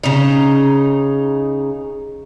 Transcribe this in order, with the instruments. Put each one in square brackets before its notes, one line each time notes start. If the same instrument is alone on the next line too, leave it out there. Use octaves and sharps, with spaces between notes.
[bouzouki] C#3 D#4